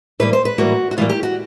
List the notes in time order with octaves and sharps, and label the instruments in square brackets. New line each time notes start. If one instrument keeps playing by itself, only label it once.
[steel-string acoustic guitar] A2 E3 G3 A#3 B4
C5
B4
A2 E3 G3 A#3 F#4
F#4
A2 E3 G3 A#3 F4
G4
F#4